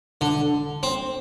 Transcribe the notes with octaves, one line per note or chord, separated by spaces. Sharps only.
D3
C4